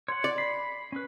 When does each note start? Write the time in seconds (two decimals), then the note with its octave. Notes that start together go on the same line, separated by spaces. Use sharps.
0.08 C#5 F#5 C6
0.24 D5
0.38 B5 C7
0.92 C#4 B4